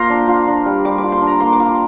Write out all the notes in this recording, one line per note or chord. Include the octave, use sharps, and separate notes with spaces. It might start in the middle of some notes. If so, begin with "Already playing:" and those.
Already playing: A#3 F4 C5 A#5 C6
D4
F4
D4
G3
G3 D6
D6
F4
C6
D4
A#5
A#3 C6
D6
F4 C6